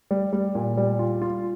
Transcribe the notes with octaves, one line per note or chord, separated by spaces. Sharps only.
G3
G3
A#2
G3
F4
F4